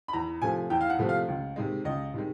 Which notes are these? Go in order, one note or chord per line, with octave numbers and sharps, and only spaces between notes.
B5
E2 A#5
C3 F3 A3 G#5
E2 G5
F5
F#5
C3 F3 A3
F5
C#2
C3 D#3 G#3
C#2 D#5
C3 D#3 G#3